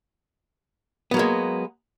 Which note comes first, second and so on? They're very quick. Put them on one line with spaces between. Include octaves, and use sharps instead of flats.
B3 F#3 A#3 G#3